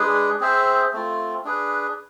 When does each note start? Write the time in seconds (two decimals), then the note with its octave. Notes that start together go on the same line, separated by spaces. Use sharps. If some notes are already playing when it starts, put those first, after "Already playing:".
Already playing: G#3 D4 G#4 B4
0.41 C4 G#4 C5 E5
0.93 A3 C4 F4
1.45 D4 G#4 B4